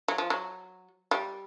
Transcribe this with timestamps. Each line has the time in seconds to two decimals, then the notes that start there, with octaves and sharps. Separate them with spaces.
0.08 F#3
0.18 F3
0.30 F#3
1.11 G3